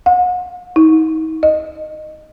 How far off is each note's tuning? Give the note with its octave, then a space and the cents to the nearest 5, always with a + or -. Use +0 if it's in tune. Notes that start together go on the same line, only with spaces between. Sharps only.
F#5 -40
D#4 +40
D#5 -15